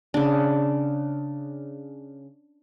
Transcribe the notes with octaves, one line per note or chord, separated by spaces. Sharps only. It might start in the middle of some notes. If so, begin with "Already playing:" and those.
C#3 D4